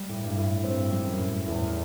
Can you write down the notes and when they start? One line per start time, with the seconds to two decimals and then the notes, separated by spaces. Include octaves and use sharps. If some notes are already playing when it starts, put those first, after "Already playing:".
Already playing: G3
0.09 A2
0.23 G2
0.37 A2
0.64 G2 C4
0.92 G3
1.05 F#2
1.19 A2
1.46 E2 A2